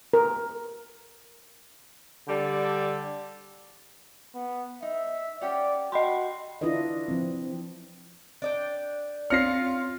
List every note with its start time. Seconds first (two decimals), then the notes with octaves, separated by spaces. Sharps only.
0.13 A#4
2.28 D3 G3 G4 A4
4.34 B3
4.82 D#4 E5
5.41 C#4 G4 D5 F#5
5.92 F#4 G4 D#5 B5 C6
6.61 D4 E4 F4 B4 D#5
7.08 F3 C4
8.42 D4 D5 G5
9.30 C4 F4 C#5 F6 A#6 C7 C#7